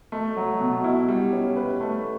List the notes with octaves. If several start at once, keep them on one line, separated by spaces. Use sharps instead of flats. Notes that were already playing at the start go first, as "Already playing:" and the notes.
A3
F#3
B2
E4
G3
C#4
B4
A3